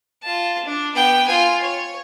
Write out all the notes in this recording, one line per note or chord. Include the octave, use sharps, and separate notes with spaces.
F4 A5
D4
B3 G5
F4 G#5
C#5